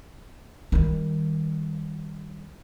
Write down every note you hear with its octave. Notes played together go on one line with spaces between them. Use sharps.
D#3 G3